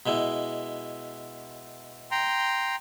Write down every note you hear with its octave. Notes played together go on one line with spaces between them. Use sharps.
B2 G#3 E4
G5 A#5 C6